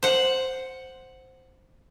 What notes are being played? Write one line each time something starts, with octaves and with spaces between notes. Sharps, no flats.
C5 F#5